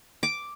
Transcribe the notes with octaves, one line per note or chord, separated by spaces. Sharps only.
D6